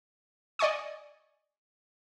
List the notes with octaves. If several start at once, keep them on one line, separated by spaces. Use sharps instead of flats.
D5 D#5 G#5 C#6 D#6